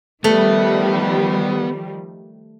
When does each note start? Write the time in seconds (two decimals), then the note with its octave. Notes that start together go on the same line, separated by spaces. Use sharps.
0.24 D#3 F3 G3 A3 B3